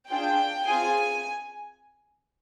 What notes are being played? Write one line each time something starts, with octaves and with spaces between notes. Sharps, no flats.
D4 F4 G#4 G5
C4 F4 G#4 G#5